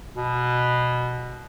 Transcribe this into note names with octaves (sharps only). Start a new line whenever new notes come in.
B2